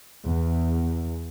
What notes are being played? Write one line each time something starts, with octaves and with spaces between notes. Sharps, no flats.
E2